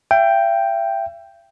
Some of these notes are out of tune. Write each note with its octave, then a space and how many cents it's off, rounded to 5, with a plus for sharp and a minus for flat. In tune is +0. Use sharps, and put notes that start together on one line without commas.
E5 +40 G5 +0